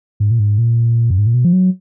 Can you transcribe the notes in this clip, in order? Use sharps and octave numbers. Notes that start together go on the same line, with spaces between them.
G#2
A#2
G#2
A#2
F#2
G#2
A#2
B2
F3
F#3